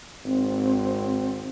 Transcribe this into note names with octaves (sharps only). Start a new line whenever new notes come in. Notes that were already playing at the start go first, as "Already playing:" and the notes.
G#1 C4